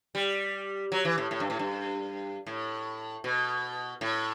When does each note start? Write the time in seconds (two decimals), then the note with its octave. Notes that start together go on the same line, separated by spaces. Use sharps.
0.15 G3
0.92 F#3
1.05 E3
1.18 A2
1.31 A2
1.40 G2
1.50 A2
1.59 G2
2.46 A2
3.24 B2
4.01 A2